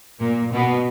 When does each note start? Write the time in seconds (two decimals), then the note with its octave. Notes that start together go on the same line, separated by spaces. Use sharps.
0.19 A#2 A#3
0.52 B2 B3